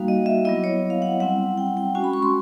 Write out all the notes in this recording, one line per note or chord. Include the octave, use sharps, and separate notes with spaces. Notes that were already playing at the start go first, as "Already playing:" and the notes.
Already playing: G3 A#3 D#4 F#4 F5
D#5
E5
F#3 B3 E4 D#5
C#5
F5
F#5
G3 C4 E4 F#5
G5
G5
G#3 C#4 F#4 G#5
B5
C#6
C6